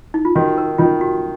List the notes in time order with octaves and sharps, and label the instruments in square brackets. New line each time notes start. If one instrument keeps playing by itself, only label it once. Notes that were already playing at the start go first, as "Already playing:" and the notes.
[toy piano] D#4
F4
[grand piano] D#3 [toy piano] F#4
[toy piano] A#4
[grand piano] D#3 [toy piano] F4
[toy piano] F#4